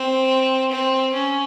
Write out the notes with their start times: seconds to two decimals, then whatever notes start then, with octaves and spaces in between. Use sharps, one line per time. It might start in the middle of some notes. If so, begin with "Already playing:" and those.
Already playing: C4
0.71 C4
1.13 C#4